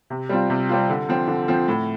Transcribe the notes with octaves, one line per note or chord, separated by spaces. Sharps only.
C3
G3 C4 F4
C3
G3 C4 F4
D3
F3 C4
D3
F3 C4
A2